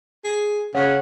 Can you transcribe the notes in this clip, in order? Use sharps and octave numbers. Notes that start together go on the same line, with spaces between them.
G#4
C#3 C#5 F#5